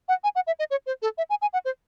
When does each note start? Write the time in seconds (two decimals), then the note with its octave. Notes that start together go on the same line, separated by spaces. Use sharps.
0.08 F#5
0.24 G#5
0.35 F#5
0.47 E5
0.59 D#5
0.70 C#5
0.86 C5
1.02 A4
1.18 E5
1.30 G#5
1.42 G#5
1.53 F#5
1.65 C5